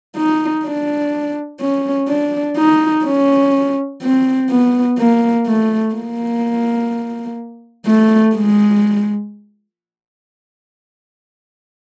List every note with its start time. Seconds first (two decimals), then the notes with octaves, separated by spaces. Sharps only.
0.17 D#4
0.65 D4
1.61 C#4
2.09 D4
2.58 D#4
3.05 C#4
4.02 C4
4.50 B3
4.98 A#3
5.46 A3
5.95 A#3
7.86 A3
8.35 G#3